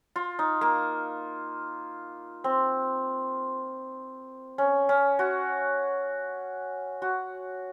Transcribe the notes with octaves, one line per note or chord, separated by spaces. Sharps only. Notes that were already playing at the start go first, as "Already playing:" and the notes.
F4
D#4
A#3
C4
C#4
C#4
F#4
F#4